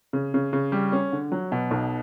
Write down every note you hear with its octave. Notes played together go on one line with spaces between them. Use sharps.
C#3
C#3
C#3
G3
C#4
D3
F#3
B2
B1